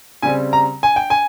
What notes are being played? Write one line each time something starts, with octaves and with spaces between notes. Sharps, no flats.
C#3 G3 C4 G#5
A#5
G#5
G5
G#5